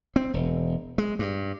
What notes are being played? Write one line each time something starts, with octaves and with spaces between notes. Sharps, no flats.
C4
E1
G#3
G2